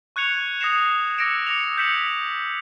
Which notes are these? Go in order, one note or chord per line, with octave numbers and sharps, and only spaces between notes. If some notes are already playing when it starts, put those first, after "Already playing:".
C#6 F#6 G#6 C#7 F7
D#6 G#6 A#6 C7 C#7 E7
D6 E6 A#6 C#7 D7 E7
D6 A#6 C#7 F7
G6 A#6 B6 C#7 E7 F#7